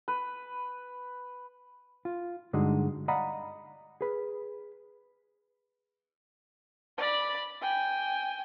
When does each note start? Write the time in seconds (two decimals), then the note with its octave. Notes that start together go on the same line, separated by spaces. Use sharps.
0.08 B4
2.05 F4
2.53 G2 D3 G#3 D4 D#4 F#4
3.08 D5 D#5 F5 F#5 A#5 B5
4.01 G#4 B4
6.97 D5 B5
7.61 G5 G#5